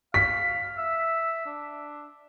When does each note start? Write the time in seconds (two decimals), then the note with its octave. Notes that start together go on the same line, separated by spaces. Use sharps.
0.14 F5 B6
0.78 E5
1.46 D4